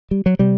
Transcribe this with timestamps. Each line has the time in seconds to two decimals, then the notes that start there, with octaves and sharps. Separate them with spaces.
0.11 G3
0.26 F#3
0.39 C3 G3